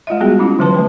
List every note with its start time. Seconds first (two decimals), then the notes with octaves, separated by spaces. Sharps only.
0.07 G#3 F4 D#5 E5
0.20 G3 B3 F4 F#4 G#4 G5
0.39 C#4 E4 F4
0.59 D3 E3 F#3 B4 A5 C6
0.74 F3 A3 B4